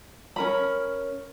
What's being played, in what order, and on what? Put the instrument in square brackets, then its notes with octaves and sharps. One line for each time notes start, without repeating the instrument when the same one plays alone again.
[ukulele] C#4 A#4 B5